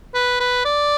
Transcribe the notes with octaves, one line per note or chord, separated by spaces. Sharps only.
B4
B4
D5